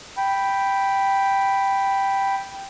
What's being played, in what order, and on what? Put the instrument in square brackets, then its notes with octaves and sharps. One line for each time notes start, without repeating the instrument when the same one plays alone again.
[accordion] G5 B5